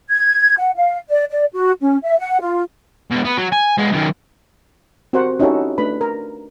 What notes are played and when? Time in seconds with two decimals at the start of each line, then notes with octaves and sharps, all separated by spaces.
0.10 G#6
0.58 F#5
0.76 F5
1.09 D5
1.31 D5
1.52 F#4
1.81 C#4
2.03 E5
2.19 F#5
2.41 F4
3.11 B2 G#3
3.24 B3
3.37 F#3
3.52 G#5
3.78 G#3 B3
3.92 F#2 D#3
5.13 C4 F#4 G4 A#4 C5 F#5
5.40 C#4 D#4 E4 F#4 G4 A4
5.78 A3 D4 B4 B5
6.01 A#4